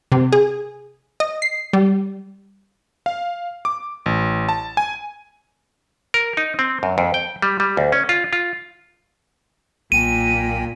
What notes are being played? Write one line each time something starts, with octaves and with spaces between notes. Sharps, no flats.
C3
G#4
D#5
C7
G3
F5
D6
A1
A5
G#5
A#4
D#4
C4
F#2
F2
G5
G3
G3
D2
C#4
F4
F4
B1 A#2 G5 G#5 D#7